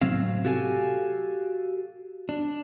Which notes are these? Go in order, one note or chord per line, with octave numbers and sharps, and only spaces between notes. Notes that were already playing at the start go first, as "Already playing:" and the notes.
A2 C3 F#3 C4 F5
F#4 G4 A4 F5 F#5 G#5
D4